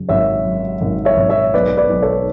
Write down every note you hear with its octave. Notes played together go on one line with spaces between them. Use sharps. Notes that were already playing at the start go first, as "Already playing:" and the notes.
Already playing: F#2 C#3
G#1 C#5 E5
F#2
G#1
C#5 E5
G#1
C#5 E5
B1 B4 D5
B4 D5
B1
A4 C#5